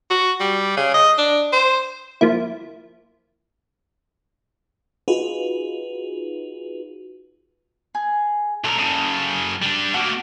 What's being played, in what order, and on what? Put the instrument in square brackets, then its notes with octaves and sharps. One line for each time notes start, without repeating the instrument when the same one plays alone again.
[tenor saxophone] F#4
G3
C#3
D#5
D4
C5
[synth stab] F3 A#3 E4
[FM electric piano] D#4 F4 F#4 G#4 B4
[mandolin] G#4
[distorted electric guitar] B1 A#4 [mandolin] A4
[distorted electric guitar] F#2 C#3
G3 D4
[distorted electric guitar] A3 A#3 [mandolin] F#4